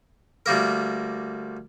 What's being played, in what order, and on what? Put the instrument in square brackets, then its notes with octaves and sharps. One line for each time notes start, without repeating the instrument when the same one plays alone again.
[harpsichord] D2 G3 A#3 A#4